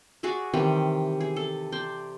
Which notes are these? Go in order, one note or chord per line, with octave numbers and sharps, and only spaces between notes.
F#4 G#4 D5 E5
C3 D#3 E3 G3
G#4
A4
C5 D5 G5